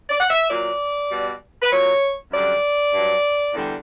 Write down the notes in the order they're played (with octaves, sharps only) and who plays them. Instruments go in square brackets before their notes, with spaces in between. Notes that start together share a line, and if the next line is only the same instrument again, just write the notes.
[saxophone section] D5
F#5
E5
A#2 F#3 D5
B2 G3
B4
A#2 F#3 C#5
F#2 D3 G3 D5
G2 F#3
E2 D3 G3